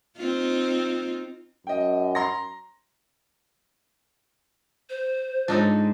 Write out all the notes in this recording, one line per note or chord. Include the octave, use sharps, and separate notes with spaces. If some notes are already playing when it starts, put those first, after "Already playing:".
C4 D#4 F4
F#2 D#5 G5
A#5 C6 A#6
C5
G#2 D4 D#4 F4 A4 C#5